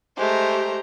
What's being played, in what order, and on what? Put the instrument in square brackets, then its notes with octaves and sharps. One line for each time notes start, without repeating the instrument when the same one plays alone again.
[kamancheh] G#3 A3 [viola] G4 [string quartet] C5 A#5